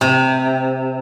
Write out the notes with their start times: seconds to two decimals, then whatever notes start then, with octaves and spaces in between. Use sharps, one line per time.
0.01 C3